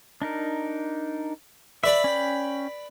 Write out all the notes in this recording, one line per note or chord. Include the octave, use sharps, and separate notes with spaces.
D4 D#4 A#4
B4 D5 E5 B5
C#4 G5